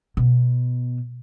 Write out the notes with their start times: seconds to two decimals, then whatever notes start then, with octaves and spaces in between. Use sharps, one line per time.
0.17 B2